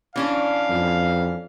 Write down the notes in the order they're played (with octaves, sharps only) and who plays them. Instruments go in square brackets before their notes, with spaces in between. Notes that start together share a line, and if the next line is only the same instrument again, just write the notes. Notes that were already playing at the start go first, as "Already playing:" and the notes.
[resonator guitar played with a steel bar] E3 C#4 D4 [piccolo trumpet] F5
[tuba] F2